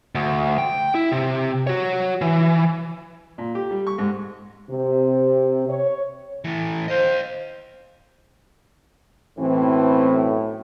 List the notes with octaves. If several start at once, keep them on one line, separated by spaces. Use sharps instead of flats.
D2
G5
E4
C3
F#4 C#5
E3
A#2
G4
G3
C#6
G#2
C3
C#5
A2 E3
C5 D#5 F5
B1 F#2 A2 E3 C4